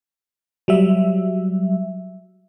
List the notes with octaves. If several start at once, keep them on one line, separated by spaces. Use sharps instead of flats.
F#3 G3 E5